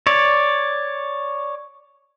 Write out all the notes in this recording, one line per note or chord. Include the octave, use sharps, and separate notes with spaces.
C#5 D5